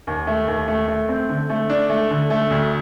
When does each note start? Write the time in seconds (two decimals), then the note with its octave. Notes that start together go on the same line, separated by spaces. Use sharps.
0.07 D#2
0.27 A3
0.48 D#2
0.68 A3
0.88 A3
1.09 C4
1.29 D3
1.49 A3
1.70 D4
1.89 A3
2.10 D3
2.30 A3
2.51 D2